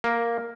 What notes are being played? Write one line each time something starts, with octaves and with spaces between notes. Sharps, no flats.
A#3